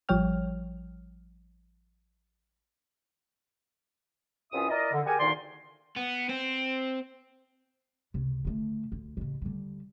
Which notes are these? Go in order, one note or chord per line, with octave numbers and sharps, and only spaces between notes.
A1 F3 G3 C#5 G5 F6
C2 E3 C#4 F4 E5 D#6
E4 A#4 D5 D#5
D3
G4 G#4 A#4 F#5 G#5
D2 A#2 D#3 D#4 D5 C6
B3
C4
C#2 C3
D3 A3
D2
A1 C#3
D3 G3